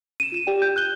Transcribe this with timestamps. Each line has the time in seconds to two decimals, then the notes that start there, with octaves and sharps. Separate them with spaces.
0.20 D#7 E7
0.32 F4 E7
0.47 G4 D5 G5
0.62 G6
0.76 F#6 G7